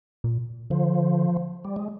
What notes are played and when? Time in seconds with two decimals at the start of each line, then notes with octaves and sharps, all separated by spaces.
0.24 A#2
0.70 D3 F3
1.65 G3
1.76 G#3